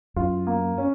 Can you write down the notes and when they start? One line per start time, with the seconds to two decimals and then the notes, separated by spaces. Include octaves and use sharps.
0.16 F#2 F4
0.47 A#3
0.78 C#4